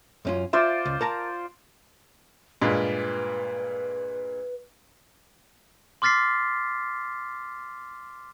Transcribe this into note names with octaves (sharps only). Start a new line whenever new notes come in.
F#2 C#4 F4
F4 C5 D5 E5
C#2
A#4 A5 A#5
G2 A#2 G#3 B4
C6 D6 F6 A6 B6 C7